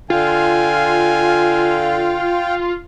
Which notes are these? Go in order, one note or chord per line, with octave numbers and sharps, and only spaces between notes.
D3 F4 F5 G5 G#5